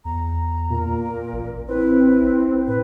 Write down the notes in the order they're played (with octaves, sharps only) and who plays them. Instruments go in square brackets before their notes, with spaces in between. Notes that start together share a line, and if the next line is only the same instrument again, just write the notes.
[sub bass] E2 [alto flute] A#5
[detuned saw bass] A#2 [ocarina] A#4
[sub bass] A1
[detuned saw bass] C4 [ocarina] E4 [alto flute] B4
[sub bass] A2 [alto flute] B4